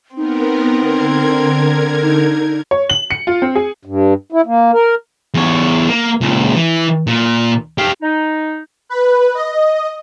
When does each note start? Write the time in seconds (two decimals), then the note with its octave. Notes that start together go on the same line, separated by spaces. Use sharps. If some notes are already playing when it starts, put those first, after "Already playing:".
0.17 B3 C4 D#4 A#4
0.80 D3 A#4 G#6
2.03 D#4
2.71 C#5
2.90 F#7
3.11 C#7
3.27 F4
3.42 C4
3.55 G#4
3.85 G2
4.32 E4
4.46 A#3
4.73 A#4
5.34 E2 C#5
5.88 A#3
6.21 C#2 A#2
6.54 E3
7.07 A#2
7.78 G4 F5
8.02 D#4
8.89 B4
9.35 D#5